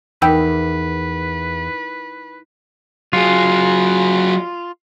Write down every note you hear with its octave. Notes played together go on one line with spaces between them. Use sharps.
E2 D#4 A#4 B4 G5 B5 E6
F#3 F4 G#4